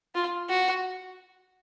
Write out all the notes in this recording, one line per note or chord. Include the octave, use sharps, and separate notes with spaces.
F4
F#4